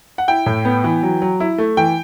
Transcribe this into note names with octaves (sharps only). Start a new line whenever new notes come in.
F#5
E4 G5
A2
B3
E3
F#3
F#3
E4
A3
E3 G5